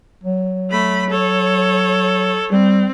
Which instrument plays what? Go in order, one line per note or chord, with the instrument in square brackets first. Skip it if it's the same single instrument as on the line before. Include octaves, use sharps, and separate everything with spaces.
[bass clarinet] F#3
[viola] A3 B5
A4 C#5
[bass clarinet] G3 [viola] C4